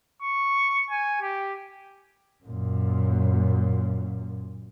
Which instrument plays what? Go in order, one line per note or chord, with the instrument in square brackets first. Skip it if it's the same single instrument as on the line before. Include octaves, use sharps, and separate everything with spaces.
[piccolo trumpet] C#6
G#5
G4
[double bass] F#2 A#2